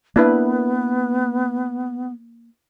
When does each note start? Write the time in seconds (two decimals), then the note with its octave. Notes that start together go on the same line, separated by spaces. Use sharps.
0.16 A#3 B3 D4 E4 B4